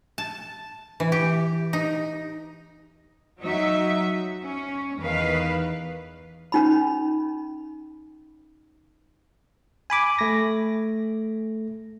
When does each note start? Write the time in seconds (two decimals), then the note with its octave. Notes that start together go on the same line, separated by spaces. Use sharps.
0.18 A5
1.00 E3
1.12 G4
1.73 D#4
3.41 F#3 D#4 E5
4.43 C#4
5.00 E2 D#3 B4 F5
6.52 C#4 D#4 B5
9.90 G#5 B5 D6
10.19 A3 A#6